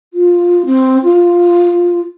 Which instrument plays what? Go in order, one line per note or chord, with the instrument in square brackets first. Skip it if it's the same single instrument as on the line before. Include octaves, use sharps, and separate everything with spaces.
[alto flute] F4
C4
F4